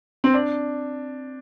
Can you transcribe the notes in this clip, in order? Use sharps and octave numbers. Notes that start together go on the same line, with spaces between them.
C4
D4